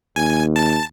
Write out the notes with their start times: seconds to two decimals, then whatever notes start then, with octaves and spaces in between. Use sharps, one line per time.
0.16 D#2 G#5
0.56 A5